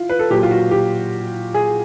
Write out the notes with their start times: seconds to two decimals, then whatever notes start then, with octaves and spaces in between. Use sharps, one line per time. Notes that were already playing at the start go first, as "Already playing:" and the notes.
Already playing: E4 F4
0.09 B4
0.19 A4
0.30 A#2 F#3 G4
0.43 F4
0.51 F#4
0.71 G4
1.54 G#4